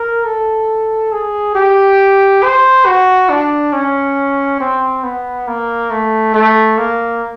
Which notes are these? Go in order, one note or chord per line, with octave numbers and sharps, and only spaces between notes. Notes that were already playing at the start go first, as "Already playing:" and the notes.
Already playing: A#4
A4
G#4
G4
C5
F#4
D4
C#4
C4
B3
A#3
A3
A3
A#3